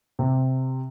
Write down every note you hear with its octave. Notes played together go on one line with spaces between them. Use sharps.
C3